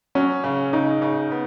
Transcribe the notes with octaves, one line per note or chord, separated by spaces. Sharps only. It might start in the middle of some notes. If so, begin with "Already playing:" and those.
F#3 C#4
C#3
C#3 D#4
C#3
B3